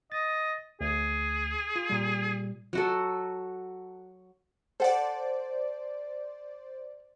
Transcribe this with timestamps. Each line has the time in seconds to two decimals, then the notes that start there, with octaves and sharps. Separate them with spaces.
0.12 D#5 A6
0.81 D2 G#4
1.76 F4
1.90 A#2 G3
2.73 F#3 F#4 A4
4.80 A4 C5 D5 F#5 A5